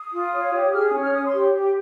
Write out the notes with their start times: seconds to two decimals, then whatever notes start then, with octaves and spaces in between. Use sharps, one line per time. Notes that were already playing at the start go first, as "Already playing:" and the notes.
Already playing: D#6
0.13 F4
0.32 C#5
0.53 G4
0.73 G#4 F6
0.86 D#6
0.93 C#4
1.00 F6
1.12 C#5 D#6
1.26 C6
1.33 G4
1.53 G4